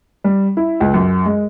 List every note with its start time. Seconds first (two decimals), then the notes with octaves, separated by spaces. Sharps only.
0.24 G3
0.57 E4
0.80 C#2
0.94 F#2
1.26 G#3